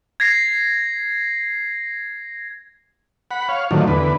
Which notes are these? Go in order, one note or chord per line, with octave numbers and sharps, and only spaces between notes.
G#6 A#6 C7
F#5 B5
C#5 F5
A2 D3 D#3 F3 F#3
E2 D3 B4